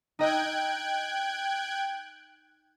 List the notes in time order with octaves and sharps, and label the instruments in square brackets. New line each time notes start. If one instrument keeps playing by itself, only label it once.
[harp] D#4 D#5 E6 [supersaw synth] G5 F#6 G#6